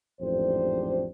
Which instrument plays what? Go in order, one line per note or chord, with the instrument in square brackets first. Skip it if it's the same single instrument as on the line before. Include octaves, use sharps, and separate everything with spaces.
[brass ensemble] A1 F2 G#2 D4 G4 C5